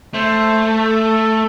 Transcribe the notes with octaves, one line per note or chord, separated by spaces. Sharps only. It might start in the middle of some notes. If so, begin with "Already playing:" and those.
A3 C5
A4